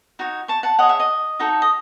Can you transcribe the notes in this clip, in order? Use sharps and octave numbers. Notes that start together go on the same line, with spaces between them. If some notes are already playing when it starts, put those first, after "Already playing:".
D#4 F#4 C#5
A5 C#6
F#5 A5
G#4 C#5 D#5 F#5
E5
D#5
D#4 F#4 A4
D#5